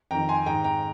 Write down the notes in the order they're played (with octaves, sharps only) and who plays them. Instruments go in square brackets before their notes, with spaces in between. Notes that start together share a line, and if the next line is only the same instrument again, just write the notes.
[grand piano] F2 D#3 G5 A#5
G#5 C6
G#2 D#3 G5 A#5
G5 A#5